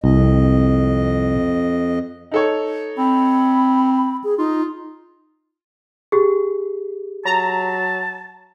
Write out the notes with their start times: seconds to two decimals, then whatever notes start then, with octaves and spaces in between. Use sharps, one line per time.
0.04 C2 F2 D#5
2.32 D#4 A4 C#5
2.98 C4 B5
4.24 G#4
4.38 D#4 F4
6.12 G4 G#4
7.26 F#3 A5 A#5